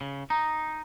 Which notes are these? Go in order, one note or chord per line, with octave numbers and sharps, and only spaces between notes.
C#3
D#4 A#5